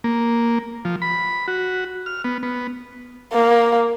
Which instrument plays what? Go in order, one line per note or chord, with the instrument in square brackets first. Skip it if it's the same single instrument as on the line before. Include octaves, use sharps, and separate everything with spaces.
[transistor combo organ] A#3
F3
B5
F#4
F6
B3
B3
[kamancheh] A#3